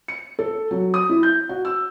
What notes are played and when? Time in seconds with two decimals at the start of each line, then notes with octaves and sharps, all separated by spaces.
0.08 C#7
0.39 A4
0.71 F#3
0.94 D#6
1.09 E4
1.23 G6
1.49 F#4
1.65 E6